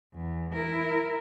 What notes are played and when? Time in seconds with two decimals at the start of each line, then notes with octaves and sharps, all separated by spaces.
0.14 E2
0.53 E4 A#4